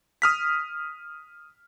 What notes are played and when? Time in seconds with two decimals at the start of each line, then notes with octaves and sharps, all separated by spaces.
0.22 D#6 F6 B6